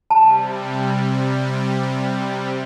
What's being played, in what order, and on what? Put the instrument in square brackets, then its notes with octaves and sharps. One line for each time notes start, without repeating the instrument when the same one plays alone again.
[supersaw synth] C3 G3 [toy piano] A5